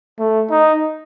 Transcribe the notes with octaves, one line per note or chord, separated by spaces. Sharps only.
A3
D#4